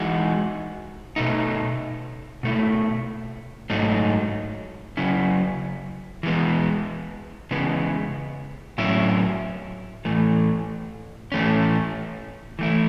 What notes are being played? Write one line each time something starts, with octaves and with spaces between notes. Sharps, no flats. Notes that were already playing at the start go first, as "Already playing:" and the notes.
Already playing: E3 G#3 D#4 F#4
B2 A3 D#4
B2 A3 E4
G#2 F#3 A3 D#4
C#3 F#3 C#4 E4
E3 G#3 B3
C#3 E3 G#3 B3
A2 F#3 C#4 E4
A2 E3 A3
A2 E3 A3 C#4
E3 A3 E4